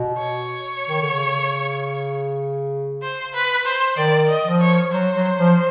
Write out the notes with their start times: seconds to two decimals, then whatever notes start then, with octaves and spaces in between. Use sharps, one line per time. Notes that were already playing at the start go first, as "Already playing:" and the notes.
Already playing: B2
0.18 C#5
0.89 D#3
1.01 D3
1.13 C#3
3.02 C5
3.34 B4
3.66 C5
3.98 D#3 D5
4.28 D#5
4.45 F3
4.61 C#5
4.92 F#3 C5
5.16 F#3
5.39 F3